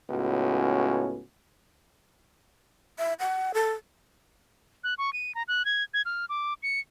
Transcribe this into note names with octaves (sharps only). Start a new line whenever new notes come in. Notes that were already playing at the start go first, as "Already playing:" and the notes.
C#2 A2 B3 C#4 F#4
E5
F#5
A4
F#6
C#6
D#7
A#5
F#6
G#6
G#6
F6
D6
C#7